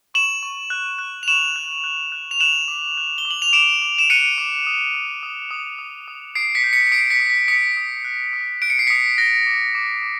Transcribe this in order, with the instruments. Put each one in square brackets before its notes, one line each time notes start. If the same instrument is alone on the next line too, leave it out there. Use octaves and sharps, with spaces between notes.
[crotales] C#6 E7 F#7
C#6
F#6
F#6
F7
C#6 E7 F#7
F#6
F#6
F#6
F7
F#6 E7 F#7
D6
F#6
G7
D6
F#7
F7
D6 D7 E7
D6
E7
F#6 C#7 D#7
D6
D#6
D#6
D#6
D#6
D#6
D#6
D#6 C7 D7
B6 C#7
G6
B6 C#7
C#7
D#6 C7 D7
B6 C#7
D#6
B6
D#6 B6 C#7
D#6
F#6
D#6
F#6 D7
C#7
C7
D#6 B6 C#7
F#6 A#6
D6
D6
D6